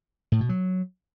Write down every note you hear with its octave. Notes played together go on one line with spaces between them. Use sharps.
A2
B2
F#3